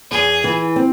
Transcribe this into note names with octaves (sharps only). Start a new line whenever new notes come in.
E2 G#4
E3
C4